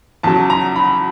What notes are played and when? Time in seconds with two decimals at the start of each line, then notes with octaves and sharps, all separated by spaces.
0.23 E2 C#3 F#3 A5
0.50 A#5
0.76 B5